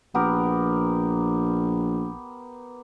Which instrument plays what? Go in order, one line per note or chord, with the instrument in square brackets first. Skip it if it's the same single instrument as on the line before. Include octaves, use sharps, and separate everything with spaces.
[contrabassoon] A#1 [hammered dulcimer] B3 G4 A#4